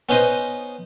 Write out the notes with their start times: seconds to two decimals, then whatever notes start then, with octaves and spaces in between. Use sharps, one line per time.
0.09 B3 C#4 D#4 B4 C5 D#5